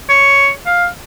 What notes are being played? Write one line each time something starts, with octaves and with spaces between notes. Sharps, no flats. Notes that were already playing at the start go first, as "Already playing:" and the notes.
C#5
F5